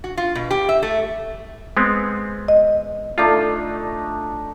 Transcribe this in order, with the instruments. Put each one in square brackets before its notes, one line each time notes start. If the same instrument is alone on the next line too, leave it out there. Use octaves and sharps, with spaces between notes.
[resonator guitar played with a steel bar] F#4
F4
B2
G4
E5
A3
[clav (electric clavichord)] G#3 B3 C4
[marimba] D#5
[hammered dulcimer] A3 D4 D#4 [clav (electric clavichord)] F4